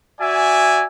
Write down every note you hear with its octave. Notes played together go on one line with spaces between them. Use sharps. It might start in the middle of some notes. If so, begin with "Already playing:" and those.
F#4 D5 E5 G#5